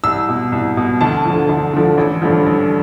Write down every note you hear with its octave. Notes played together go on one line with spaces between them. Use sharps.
C2 E6
B2
C2
B2
D2 A5
D3 F3
D2
D3 F3
A1
G2 D3 F3
A1